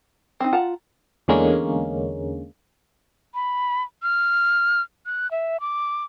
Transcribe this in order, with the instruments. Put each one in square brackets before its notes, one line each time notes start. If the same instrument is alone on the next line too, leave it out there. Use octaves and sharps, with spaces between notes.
[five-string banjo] C4 D#4
[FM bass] F4 [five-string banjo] F#5 A5 A#5
[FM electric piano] E2 D3 G#3 A#3 C#4
[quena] B5
F6
F#6
E5
D6